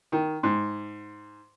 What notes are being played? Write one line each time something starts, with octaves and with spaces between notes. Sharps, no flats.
D#3
G#2